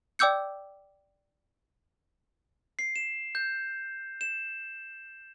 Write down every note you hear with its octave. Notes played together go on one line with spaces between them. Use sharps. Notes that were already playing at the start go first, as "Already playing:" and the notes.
D5 G5 D6 E6 G6 C#7
C7
E7
G6
E7